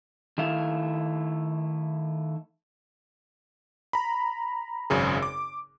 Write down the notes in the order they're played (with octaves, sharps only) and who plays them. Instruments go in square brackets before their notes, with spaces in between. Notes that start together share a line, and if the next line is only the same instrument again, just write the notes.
[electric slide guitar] D#3 A3 E4 E5 F5
[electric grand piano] A#5 B5
G#1 F#2 C#3 G#4
D6